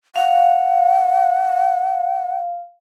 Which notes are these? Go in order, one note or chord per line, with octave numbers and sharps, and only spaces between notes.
F5 F#5